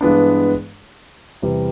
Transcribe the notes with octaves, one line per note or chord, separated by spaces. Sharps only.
G2 E3 G#3 B3 D4
E2 C3 E3 G3